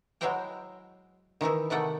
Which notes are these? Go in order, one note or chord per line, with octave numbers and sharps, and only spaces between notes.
F#3 G#3 E4 C5 G5 A#5
D#3 E3 D#4 E4
C3 D#3 A3 F#5 G5